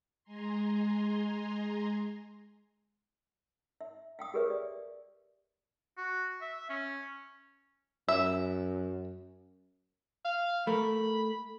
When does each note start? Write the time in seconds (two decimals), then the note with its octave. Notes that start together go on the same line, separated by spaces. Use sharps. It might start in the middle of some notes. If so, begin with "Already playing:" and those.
0.24 G#3 G#5 A#5 C6
3.81 E5
4.19 F5 G5 D#6
4.34 G4 G#4 A#4 B4 C#5 E5
4.50 D5
5.98 F#4
6.41 E5
6.70 C#4
8.08 F#2 E5
10.25 F5
10.67 A3 A#4 B5